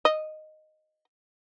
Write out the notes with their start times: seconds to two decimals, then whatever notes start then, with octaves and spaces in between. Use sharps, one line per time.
0.05 D#5